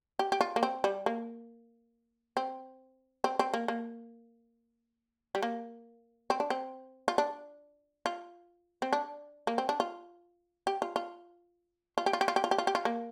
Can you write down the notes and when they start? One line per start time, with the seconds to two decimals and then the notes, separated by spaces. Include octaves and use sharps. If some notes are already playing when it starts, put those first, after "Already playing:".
0.19 G4
0.32 G4
0.41 F4
0.56 A#3
0.63 C4
0.84 G3
1.06 A#3
2.37 C4
3.24 C4
3.39 C4
3.54 A#3
3.68 A#3
5.35 G3
5.43 A#3
6.30 C4
6.40 D4
6.50 C4
7.08 F4
7.18 D4
8.06 F4
8.82 C4
8.93 D4
9.47 A#3
9.58 C4
9.69 D4
9.80 F4
10.67 G4
10.82 F4
10.96 F4
11.98 F4
12.06 G4
12.13 F4
12.21 G4
12.28 F4
12.36 G4
12.44 F4
12.51 G4
12.58 F4
12.67 G4
12.75 F4
12.85 A#3